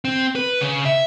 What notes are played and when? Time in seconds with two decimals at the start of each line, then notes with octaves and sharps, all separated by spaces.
0.05 C4
0.35 B4
0.61 C#3
0.85 E5